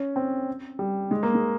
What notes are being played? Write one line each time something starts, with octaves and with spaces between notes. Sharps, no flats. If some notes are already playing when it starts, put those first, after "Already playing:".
Already playing: C#4
C4
G3
G#3
A#3
G#3